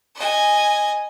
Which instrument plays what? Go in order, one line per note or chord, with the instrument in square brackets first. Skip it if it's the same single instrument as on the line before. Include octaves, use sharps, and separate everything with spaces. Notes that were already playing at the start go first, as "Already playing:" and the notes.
[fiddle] D#5 G#5